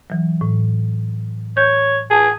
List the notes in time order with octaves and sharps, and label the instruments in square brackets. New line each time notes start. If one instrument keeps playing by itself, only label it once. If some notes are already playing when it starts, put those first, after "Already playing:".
[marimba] E3 F#3
A2
[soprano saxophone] C#5 [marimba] G6
[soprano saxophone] G#4 [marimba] A5